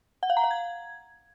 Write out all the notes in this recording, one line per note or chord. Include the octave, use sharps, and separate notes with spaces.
F#5
F5
A#5
F5
G#6